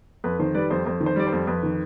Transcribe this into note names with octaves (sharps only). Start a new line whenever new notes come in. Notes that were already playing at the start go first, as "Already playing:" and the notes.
F2 B4
D#3 C5
G3 B4 D5
F2 C5
F2 C5
D#3
C5
G3 D5
C5
F2
F2 B4
D#3